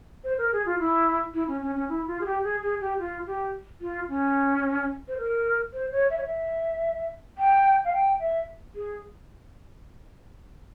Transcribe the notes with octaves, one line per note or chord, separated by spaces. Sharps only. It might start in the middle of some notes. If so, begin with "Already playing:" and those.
C5
A#4
G#4
F4
E4
E4
C#4
C#4
C#4
E4
F4
G#4
G4
G#4
G#4
G4
F4
G4
F4
C#4
C5
A#4
C5
C#5
E5
C#5
E5
G5
F5
G5
E5
G#4